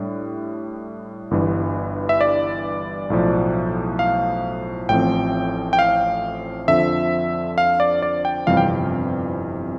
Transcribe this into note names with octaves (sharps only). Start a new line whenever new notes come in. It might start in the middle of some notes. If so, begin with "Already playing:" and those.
Already playing: A2 G3 D4
G1 G2 E3 G3
E5
D5
B1 A2 F3
F5
A1 A2 F3 C4 G5
G5
F5
F2 D3 F3 E5
F5
D5
D5
G5
G1 F2 C3 E3 G3 F5
G5